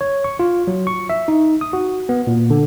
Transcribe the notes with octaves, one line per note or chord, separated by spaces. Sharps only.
C#5
C#6
F4
F#3
C#6
E5
D#4
D#6
F#4
B3
A#2
D3